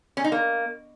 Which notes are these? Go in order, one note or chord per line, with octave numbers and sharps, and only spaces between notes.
C#4
D#4
A#3